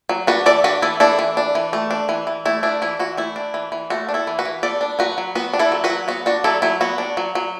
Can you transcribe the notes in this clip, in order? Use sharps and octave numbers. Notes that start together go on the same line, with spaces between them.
F#3
D4 F#4 B4
E3 A4 D5
D4 F#4 B4
E3 E4 A4
D4 E4 A4
E3
D4
E3
A3
D4
E3
E3
A3 E4
D4 E4
E3 E4
E3 F#4
A3 E4
D4
E3
E3
A3 F#4
D4
E4 A4
E3
F#4 B4
E3
B3 A4 D5
D4
F#3 F#4 B4
F#3
B3 F#4 B4
D4
E4 A4
F#3
F#4 B4
F#3
B3 F#4
D4 F#4
F#3 E4 A4
F#3 E4
B3 F#4
D4
F#3
F#3